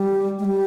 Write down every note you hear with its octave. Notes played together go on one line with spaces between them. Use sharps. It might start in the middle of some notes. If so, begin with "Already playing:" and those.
Already playing: G3
G#3
G3